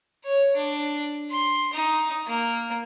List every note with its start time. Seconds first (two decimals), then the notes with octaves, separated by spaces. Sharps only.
0.24 C#5
0.56 D4
1.30 C6
1.73 D#4
2.27 A#3